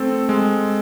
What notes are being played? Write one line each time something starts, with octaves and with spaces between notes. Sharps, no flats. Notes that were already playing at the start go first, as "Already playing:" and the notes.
Already playing: A3 C4 A4
G#3